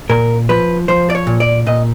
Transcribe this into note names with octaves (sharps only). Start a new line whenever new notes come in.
A#2 A#4
F3 B4
F3 C5
D5
C#5
A#2
D5
A#2 D#5